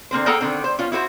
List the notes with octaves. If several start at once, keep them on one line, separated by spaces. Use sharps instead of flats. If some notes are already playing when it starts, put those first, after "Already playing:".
D3 A#3 C4 C5
A#3 G#4 A4 F#5 G5 A#5
D3 D#3 C4
C5
C#4 F4
E4 F#4 B4 C5